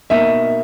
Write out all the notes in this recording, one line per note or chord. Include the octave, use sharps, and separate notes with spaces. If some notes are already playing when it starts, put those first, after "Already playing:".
B2 A#3 D#4 E5